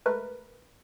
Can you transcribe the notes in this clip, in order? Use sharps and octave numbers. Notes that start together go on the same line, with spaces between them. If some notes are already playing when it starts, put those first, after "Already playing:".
G#3 A3 A#4 B4